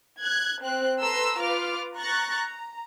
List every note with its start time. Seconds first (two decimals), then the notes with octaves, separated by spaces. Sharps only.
0.22 F#6 G#6
0.63 C4 F#6
1.01 A4 B4 A#5 C6 E6
1.39 F4 B4 D6 F6
1.97 A#5 C#6 F#6 A6 A#6
2.36 A#5